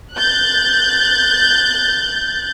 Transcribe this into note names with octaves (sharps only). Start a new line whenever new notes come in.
F#6 G6 A6